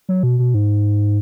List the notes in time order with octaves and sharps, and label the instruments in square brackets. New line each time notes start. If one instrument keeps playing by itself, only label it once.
[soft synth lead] F#3
B2
B2
G#2